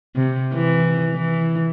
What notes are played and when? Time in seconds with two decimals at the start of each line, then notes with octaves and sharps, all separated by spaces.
0.15 C3
0.54 E3
1.14 E3